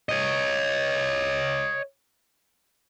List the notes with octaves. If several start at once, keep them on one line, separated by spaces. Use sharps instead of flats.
C#5 D#5